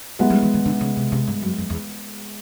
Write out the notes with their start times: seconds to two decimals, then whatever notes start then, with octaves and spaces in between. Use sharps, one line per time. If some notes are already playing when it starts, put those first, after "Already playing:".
0.19 G3 G#3 B3 E4
0.30 G3
0.43 E3
0.54 D#3
0.66 D3
0.81 C#3
0.97 C3
1.12 C3
1.27 G2
1.42 F#2
1.58 F2
1.70 E2